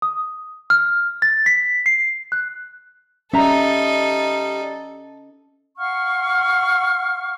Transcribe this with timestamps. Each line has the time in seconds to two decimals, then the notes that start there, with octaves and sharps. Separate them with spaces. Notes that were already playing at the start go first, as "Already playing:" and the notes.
0.02 D#6
0.70 F6
1.22 A6
1.46 B6
1.86 C7
2.32 F#6
3.33 G3 C#4 D#4 A4 E5 A#5
5.78 F5 F#5 C#6 F6